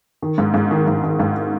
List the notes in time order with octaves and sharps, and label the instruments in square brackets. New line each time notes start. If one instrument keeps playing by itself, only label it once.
[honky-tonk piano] D#3
G#2
G#2
D#3
G#2
D#3
G#2